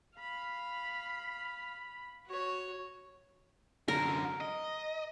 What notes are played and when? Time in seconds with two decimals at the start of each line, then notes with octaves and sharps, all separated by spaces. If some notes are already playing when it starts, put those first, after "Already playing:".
0.19 F5 B5
2.26 F#4 C#5
3.88 F#2 D3 A#4
4.41 D#5